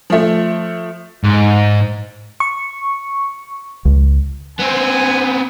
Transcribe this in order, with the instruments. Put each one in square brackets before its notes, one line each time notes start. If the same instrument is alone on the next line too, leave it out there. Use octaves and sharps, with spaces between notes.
[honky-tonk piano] F3 A3
[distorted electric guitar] G#2
[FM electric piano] C#6
[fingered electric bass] C#2
[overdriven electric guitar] B3 C4 [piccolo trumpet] G#5